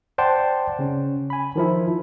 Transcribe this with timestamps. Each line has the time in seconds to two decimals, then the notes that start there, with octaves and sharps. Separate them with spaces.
0.18 C5 D5 F#5 G5 A5 C6
0.79 C#3 C#4
1.30 G#5 B5
1.56 D#3 F3 E4